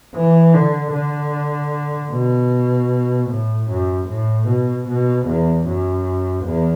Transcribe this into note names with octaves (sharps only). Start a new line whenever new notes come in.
E3
D3
D3
B2
A2
F#2
A2
B2
B2
E2
F#2
E2